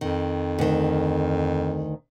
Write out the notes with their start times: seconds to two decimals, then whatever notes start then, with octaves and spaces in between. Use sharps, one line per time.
0.01 F2 D#3
0.59 D2 D#3